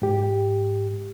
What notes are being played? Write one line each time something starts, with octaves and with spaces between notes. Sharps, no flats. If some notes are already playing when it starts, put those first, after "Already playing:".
G#2 G4